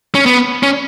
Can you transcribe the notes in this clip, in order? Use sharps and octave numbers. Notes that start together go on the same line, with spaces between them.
C#4
B3
C#4